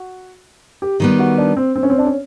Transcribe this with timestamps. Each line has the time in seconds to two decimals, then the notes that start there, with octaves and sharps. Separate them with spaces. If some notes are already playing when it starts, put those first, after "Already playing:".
Already playing: F#4
0.82 G4
1.00 D#3 G3 B3
1.19 F#4
1.38 D4
1.57 C4
1.76 C4
1.83 C#4
1.90 C4
1.98 D4
2.05 C#4